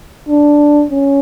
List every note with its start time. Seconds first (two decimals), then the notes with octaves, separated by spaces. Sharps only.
0.29 D4
0.91 C#4